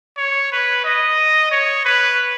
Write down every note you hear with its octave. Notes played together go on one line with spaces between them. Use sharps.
C#5
B4
D#5
C#5
B4